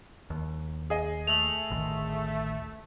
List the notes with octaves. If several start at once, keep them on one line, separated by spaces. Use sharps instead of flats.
D#2
G#4 D#5
A3 F7 F#7
A1 D2 D#3